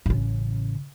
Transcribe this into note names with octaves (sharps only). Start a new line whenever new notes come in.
A1 C#3